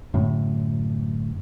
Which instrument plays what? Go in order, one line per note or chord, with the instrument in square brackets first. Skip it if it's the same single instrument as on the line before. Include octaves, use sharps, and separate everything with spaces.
[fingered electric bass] F#2 A2 D3